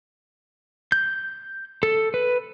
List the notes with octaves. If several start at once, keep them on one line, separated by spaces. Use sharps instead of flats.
G6
A4
B4